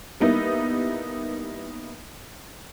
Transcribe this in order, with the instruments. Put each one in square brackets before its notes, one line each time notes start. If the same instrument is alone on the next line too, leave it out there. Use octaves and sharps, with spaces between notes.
[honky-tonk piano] G3 A#3 B3 D#4 E4